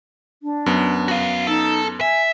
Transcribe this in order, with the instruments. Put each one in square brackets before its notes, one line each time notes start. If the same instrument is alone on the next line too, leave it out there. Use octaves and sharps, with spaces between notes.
[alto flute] D4
[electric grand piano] F#2 B3
[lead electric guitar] F#4 F5
[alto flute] D#4 [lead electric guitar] A4
[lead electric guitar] E5 [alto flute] G#5